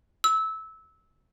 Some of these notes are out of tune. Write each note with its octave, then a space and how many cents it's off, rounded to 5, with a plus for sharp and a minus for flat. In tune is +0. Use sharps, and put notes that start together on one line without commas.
E6 -20